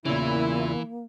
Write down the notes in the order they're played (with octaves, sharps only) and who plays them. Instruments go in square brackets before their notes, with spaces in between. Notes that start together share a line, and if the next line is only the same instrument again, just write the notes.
[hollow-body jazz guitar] E2 C#3 [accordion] A#2 E4 [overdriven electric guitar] E3 [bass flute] A#3